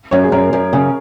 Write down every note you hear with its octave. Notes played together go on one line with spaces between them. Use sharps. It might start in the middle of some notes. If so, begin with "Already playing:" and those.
F#2 C#5
G#4
F#2 A#4
F#2
C#3